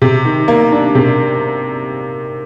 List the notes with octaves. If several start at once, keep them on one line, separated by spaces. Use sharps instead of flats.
C3
D#3
A#3
D4
C3